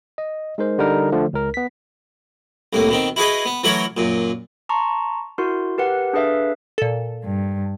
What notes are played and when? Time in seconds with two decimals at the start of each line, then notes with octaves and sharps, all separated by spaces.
0.18 D#5
0.58 G#3 D#4 A#4 C5
0.79 D3 G3 D#4 A#4
1.12 D3 F3 A3
1.33 C#2 A#4
1.54 B3 B6
2.73 C2 A2 A#3
2.89 B2 D#3 C4
3.16 E4 F#4 G#4 B4 D#5
3.45 B3
3.64 E3 F#3 A3 E4 A#4 C#5
3.97 F#2 A#2
4.69 A5 A#5 C6 C#6
5.38 E4 F#4 A#4 C6
5.78 G4 A#4 B4 F#5
6.13 D4 G#4 A4 B4 E5 F5
6.78 A#2 A4
7.23 G2